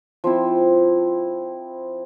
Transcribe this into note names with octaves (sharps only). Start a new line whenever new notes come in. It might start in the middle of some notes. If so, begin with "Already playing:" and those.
F3 C4 E4